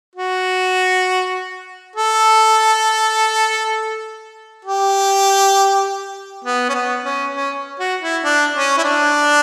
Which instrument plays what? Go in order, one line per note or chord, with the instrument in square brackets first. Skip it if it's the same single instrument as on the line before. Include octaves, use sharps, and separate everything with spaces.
[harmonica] F#4
A4
G4
B3
C#4
B3
C#4
C#4
F#4
E4
D4
C#4
E4
D4